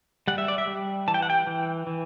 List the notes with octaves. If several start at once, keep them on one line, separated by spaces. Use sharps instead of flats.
G3 F#5
E5
D5
E5
G3
E3 A5
G5
F#5
G5
E3
E3